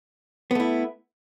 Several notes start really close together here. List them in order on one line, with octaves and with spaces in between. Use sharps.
B3 A3 E4